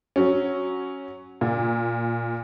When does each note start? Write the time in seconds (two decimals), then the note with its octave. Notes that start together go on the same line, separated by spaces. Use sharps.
0.16 F#3 C#4
1.41 A#2